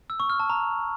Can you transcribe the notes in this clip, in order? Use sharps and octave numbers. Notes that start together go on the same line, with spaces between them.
E6
C#6
F6
A5
A#5